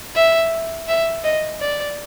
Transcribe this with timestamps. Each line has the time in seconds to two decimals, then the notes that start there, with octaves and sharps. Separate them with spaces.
0.15 E5
0.88 E5
1.24 D#5
1.60 D5